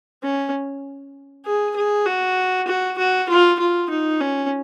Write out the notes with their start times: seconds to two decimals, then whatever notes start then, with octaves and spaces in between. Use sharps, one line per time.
0.23 C#4
1.45 G#4
1.76 G#4
2.06 F#4
2.68 F#4
2.98 F#4
3.29 F4
3.59 F4
3.90 D#4
4.20 C#4